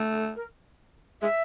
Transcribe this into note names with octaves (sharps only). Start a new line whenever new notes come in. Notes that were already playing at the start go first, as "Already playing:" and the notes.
Already playing: A3
A4
A#4
G#3 E5